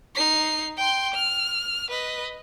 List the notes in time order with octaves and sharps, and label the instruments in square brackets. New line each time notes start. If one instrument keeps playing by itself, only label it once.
[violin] D#4 C7
G5 C6
F6
B4 D#5